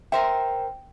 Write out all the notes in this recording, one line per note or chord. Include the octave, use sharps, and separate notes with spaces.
A#4 C5 E5 G5